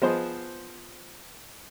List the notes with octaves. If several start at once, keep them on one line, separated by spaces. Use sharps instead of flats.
F3 B3 G#4 C5 D#5